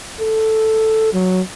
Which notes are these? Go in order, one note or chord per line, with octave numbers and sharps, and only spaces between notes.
A4
F#3